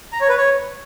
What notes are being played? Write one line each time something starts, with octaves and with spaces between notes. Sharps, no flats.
A#5
C#5
B4
C#5